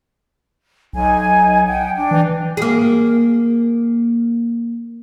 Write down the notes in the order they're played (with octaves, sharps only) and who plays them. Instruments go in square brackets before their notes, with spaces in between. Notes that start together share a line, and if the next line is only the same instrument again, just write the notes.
[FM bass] B1 [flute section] D#4 G#5
[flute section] F#5 G5
D4 G5
[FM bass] E3
[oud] A#3 G#4